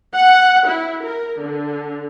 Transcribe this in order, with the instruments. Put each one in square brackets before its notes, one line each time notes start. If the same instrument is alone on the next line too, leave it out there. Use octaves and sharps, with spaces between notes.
[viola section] F#5
E4
A#4
D3